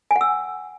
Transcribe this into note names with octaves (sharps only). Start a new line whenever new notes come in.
G#5
F#5
E6